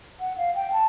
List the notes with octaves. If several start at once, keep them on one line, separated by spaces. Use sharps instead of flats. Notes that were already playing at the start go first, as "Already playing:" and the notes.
F#5
F5
G5
A5